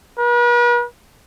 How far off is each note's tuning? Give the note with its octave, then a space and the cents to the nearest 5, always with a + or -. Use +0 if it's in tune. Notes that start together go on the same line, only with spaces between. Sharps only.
B4 -45